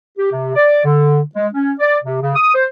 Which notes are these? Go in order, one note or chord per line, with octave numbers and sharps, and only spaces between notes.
G4
C3
D5
D3
G#3
C#4
D5
C3
C#3
D#6
C5